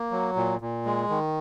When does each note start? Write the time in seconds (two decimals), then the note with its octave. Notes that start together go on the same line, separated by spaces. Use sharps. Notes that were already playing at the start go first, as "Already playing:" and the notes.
Already playing: A#3
0.11 F#3
0.36 A#2
0.61 A#2
0.86 G#3
1.10 D#3